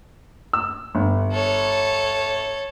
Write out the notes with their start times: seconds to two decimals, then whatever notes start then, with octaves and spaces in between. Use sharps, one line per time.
0.53 E6
0.95 G1
1.32 A4 C#5